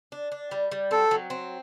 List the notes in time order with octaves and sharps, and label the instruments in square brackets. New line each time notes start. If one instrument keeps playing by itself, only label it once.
[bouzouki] D4
D4
G3
G3
[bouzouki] C4 [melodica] A4
[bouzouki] F#3
C4